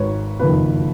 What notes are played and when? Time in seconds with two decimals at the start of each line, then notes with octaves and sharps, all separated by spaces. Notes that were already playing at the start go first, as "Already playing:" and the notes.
Already playing: G#1 G#2 D#3 B4 C#5
0.39 F#1 F2 D#3 B4